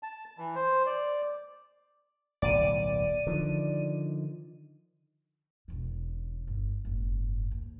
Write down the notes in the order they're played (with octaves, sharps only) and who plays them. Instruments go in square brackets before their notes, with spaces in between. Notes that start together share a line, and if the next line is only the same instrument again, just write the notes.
[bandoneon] A5
E3
C5
D5
[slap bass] D1 B1 F#3 [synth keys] D5 D#7
[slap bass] D3 D#3 F3
[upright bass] E1 C#3
G1
F#1 G#2
D#2